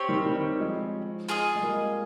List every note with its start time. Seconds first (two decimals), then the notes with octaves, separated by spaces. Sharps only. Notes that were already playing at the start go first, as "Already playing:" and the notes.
Already playing: C4 G4 C#5
0.09 D#3 G3
0.26 D#3 G3
0.60 F3 G#3
1.29 F4 G#4 D#5
1.56 G#3
1.63 G3 A#3